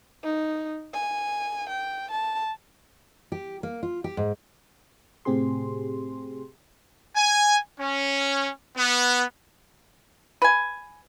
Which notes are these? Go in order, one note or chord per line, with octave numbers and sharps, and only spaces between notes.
D#4
G#5
G5
A5
G4
A#3
F4
G4
G#2
A2 C3 C4 G4 G#4 C6
G#5
C#4
B3
B4 G#5